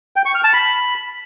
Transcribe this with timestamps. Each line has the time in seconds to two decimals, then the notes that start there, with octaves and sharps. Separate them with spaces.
0.16 G5
0.25 C#6
0.35 F6
0.44 A5
0.53 B5